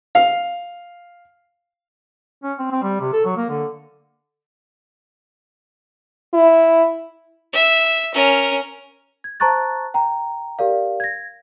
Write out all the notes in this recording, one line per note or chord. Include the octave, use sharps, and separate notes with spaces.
F5
C#4
C4
C4
G3
C3
A4
F#3
A#3
D3
E4
E5
C#4 A#4
G#6
C5 A5 A#5 C#6 F#6 A6
G5 A#5
G4 A#4 D5 F5
G#6 A#6